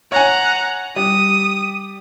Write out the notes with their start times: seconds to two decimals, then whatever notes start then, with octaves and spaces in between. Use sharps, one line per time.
0.12 C#5 F#5 G#5 A#5
0.96 G3 D#6